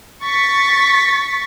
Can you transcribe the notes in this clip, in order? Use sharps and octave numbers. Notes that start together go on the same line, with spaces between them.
C#6 A6 B6